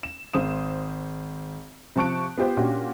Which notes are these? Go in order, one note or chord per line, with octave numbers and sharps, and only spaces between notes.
E7
G#1 C5 D#6 E7
C3 F3 A5 C#6 F#6 D7
B3 F4 G4 C5
A#2 C#4 D4 F#4 G4